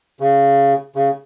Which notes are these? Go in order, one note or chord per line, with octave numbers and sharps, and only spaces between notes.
C#3
C#3